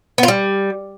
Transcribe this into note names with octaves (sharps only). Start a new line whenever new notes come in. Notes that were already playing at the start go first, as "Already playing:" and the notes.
B3
F4
G3